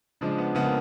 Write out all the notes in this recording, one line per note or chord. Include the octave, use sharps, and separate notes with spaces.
C#3 F3 G#3 D4
B3
C#3 F3 G#3 B3
A#3